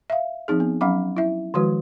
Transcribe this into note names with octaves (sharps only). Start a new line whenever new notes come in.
E5 F5
F3 C4 D#4 G#4
B3
F#3 C#4 F5 F#5 B5 D6
E4 E5
D#3 F3 G#3 F#4 B4